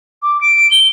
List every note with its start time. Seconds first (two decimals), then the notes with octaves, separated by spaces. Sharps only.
0.23 D6
0.41 D7
0.71 G7